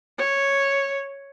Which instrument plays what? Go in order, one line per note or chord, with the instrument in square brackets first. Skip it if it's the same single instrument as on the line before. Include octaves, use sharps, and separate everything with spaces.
[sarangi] C#5